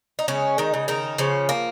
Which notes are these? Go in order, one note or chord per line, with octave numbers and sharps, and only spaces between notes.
D#4
C#3 G#3 C#4
D#3 D#4
C#3
D#3 D#4
C#3 F3 C#4
A#3